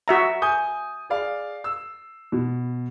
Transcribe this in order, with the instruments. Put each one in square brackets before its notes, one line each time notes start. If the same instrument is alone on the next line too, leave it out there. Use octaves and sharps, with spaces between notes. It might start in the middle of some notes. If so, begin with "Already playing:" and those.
[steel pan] F#4 E5 A#5
[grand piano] G#5 D#6 G6
G#4 D5 F5
E6
B2